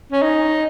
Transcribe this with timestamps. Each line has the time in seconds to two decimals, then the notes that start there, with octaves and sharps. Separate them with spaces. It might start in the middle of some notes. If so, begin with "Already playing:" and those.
0.12 C#4
0.22 D#4